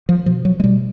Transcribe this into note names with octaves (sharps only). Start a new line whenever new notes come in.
F3
B2 F3
F#3
G#3
B2 G3